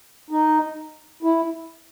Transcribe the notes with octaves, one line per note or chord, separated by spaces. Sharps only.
D#4
E4